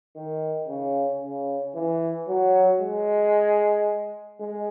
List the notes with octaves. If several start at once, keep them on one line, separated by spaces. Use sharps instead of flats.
D#3
C#3
C#3
E3
F#3
G#3
G#3